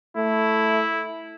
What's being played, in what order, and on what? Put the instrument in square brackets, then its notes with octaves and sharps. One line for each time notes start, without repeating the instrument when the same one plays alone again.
[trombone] A3 [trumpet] E4